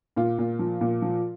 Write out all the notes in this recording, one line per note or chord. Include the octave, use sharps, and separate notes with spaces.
A#2 F4
A#2
F3
A#2
F3